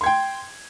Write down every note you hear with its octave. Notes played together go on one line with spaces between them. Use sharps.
G5 C6 G#6